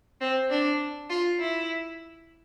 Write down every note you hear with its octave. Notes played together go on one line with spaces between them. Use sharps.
C4
D4
F4
E4